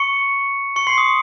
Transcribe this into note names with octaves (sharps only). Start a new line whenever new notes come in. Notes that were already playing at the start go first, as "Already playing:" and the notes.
Already playing: C#6 C#7
C#6 C#7
C6 C7
D#6
C#6